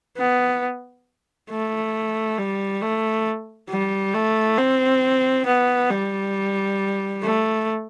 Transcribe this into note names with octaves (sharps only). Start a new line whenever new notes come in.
B3
A3
G3
A3
G3
A3
C4
B3
G3
A3